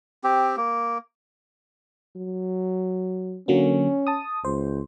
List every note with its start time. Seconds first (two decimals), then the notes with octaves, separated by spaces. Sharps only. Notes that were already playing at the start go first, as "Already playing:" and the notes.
0.24 C4 G4
0.57 A#3
2.17 F#3
3.48 D3 F#3 A#3 C#4
4.07 A5 D#6
4.45 C#2 C5